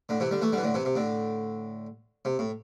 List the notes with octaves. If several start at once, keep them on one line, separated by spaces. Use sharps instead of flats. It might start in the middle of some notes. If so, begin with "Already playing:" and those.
A2 D3
C3 E3
D3 G3
E3 A3
D3 G3
E3
A2 D3
C3 E3
C3
A2 D3
C3
A2